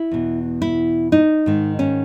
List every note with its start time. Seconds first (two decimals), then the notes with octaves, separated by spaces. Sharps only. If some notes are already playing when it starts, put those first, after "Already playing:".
Already playing: E4
0.11 E2 B2
0.62 E4
1.12 D#4
1.46 G#2 D#3
1.79 C#4